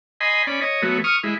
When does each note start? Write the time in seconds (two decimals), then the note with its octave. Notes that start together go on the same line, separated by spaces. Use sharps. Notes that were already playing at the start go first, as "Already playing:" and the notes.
0.21 D#5 G#5 B5 C6
0.47 C#4 D5 B5
0.61 C#5 D#5
0.82 F#3 A3 B3
1.04 C#6 D#6 F6
1.23 G#3 E4